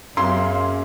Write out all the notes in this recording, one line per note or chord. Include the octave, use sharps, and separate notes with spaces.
F#2 C#3 A#3 C6